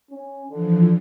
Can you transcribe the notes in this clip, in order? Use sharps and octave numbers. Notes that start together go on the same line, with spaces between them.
C#4
D3 E3 F3